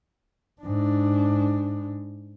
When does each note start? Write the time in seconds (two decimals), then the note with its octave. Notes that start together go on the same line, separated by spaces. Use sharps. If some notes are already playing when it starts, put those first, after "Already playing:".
0.62 G#2 D4